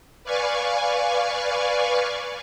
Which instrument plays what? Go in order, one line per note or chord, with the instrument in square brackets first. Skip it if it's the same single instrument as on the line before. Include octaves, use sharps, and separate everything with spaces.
[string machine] B4 D5 F5 G#5 C#6